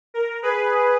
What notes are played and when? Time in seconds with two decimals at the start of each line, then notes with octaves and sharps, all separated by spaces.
0.14 A#4
0.43 G#4 B4